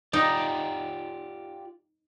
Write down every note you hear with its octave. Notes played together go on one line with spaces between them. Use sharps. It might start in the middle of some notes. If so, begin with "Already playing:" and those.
D#4 F4 G4 D5